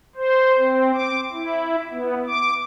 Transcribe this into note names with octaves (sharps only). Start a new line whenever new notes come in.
C5
C4
D6
E4
B3
D6